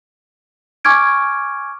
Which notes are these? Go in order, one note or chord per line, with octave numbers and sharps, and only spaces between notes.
G#5 C#6 D6 F6 G#6 D7